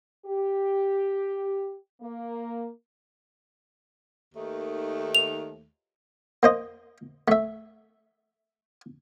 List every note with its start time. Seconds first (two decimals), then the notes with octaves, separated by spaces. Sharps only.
0.26 G4
2.01 A#3
4.35 D#2 D#3 A3
5.15 F7
6.43 A#3 C5 D#5
7.28 A3 E5